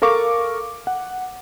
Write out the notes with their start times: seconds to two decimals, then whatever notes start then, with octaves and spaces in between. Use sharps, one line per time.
0.02 A4 A#4 F5 C#6 D6
0.87 F#5